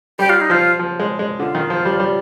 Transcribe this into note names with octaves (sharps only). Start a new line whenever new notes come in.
G3 G4
F4
D#4
F3 F4
F3
G#3
G#3
D3 F4
D#3
F3
G3
G3